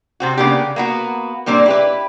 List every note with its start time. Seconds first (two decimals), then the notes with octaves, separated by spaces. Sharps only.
0.20 C3 C4 F#4
0.37 C#3 A#3 B3 D4 G4
0.76 A#3 B3 F#4
1.46 A#2 G3 A#3 C4 D4
1.66 E4 G4 B4